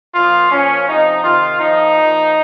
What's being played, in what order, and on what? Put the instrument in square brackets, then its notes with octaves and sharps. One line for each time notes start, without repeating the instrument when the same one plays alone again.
[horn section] A#2 F3 F4
A#2 F3 C#4
C3 F3 D#4
C3 D#3 F4
A#2 F3 D#4
A#2 F3